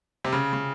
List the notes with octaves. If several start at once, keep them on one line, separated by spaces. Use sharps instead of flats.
C3
C#3
C#3